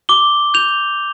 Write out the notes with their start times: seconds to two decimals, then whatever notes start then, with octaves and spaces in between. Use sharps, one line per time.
0.09 D6 G7
0.54 G6 F7